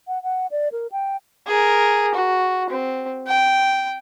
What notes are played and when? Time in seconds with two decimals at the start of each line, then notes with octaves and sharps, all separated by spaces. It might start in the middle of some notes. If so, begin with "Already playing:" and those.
0.08 F#5
0.23 F#5
0.51 D5
0.72 A#4
0.92 G5
1.47 G#4 A#4
2.14 F#4
2.70 C4
3.27 G5